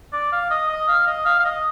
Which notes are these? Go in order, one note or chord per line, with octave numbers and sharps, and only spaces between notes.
D5
F5
D#5
D#5
F5
D#5
F5
F5
D#5